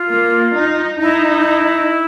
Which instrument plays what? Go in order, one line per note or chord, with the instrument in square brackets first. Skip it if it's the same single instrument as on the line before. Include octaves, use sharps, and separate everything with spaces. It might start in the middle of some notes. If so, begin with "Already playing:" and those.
Already playing: [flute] F4
[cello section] A#3
D#4
[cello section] D#4 [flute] E4